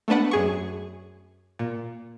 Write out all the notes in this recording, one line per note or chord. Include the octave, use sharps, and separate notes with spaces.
A3 B3 D4 B4 F#5
F#2 G#4 C#6
A#2